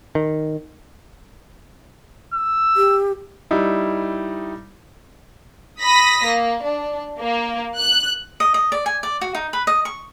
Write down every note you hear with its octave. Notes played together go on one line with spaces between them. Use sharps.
D#3
E6
G4
G3 D#4 E4
B5 D#6 A#6 B6
A#3
D4
A#3
F#6
D#5
D#5
D5
G#5
D5
F#4
D#4
B4
D#5
C#6